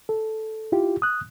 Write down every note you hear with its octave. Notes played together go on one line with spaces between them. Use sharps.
A4
E4 F4 G4
D#6 F#6